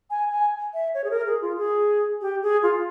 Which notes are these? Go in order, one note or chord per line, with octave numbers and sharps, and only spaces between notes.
G#5
G#5
E5
C#5
G#4
A#4
G#4
F4
G#4
G4
G#4
F4